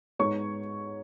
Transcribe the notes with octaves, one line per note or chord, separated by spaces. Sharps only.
G#2 G#3 B3 D#4 C#5 C#6